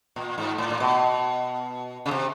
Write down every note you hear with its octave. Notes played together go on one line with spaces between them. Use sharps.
A#2
G#2
A2
A#2
B2
C#3
C3